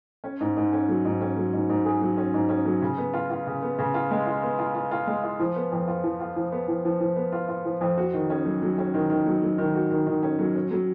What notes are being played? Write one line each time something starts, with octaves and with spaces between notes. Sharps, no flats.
C#4
G#2
G#2
C#4
F#3
G#2
C#4
F#3
G#2
G#2
G#4
F#3
C#4
G#2
C#4
F#3
C#3
B3
F4
F4
C#3
B3
C#3
F4
G#3
F4
B3
F4
F4
F4
G#3
F4
F3
B3
F2
F4
F3
F4
F3
B3
F3
F3
F3
B3
F4
F4
F3
F2
F#4
D#3
C#4
F#3
F#3
C#4
D#3
D#3
F#3
F#3
D#3
F#4
D#3
D#3
C#4
F#3
C#4
F#3